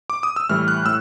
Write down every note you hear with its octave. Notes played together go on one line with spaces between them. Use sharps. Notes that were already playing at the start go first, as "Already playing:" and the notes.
D6
D#6
E6
A2 E3 G3 F6
F#6
A2 E6